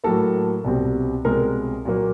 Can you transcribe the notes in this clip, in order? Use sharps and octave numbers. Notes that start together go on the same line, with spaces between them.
A2 F#3 A#3 A4
C2 B2 G3 C4
C2 B2 G#3 C4 A#4
A#2 F#3 A#3